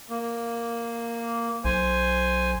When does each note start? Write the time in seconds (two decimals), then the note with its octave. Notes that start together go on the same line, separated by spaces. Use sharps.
0.10 A#3
1.65 B1 C5 G#5